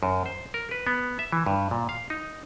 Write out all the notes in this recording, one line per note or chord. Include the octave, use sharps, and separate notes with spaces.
F#2
C5
A#4
B4
B3
E5
E3
G2
A#2
F5
D#4